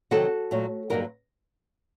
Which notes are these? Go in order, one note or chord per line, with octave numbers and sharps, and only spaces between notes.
C3 D#3 F#3 C4 F#4 A4
A#2 F#3 A3
G2 D3 F#3 A#3 D#4 G4 A#4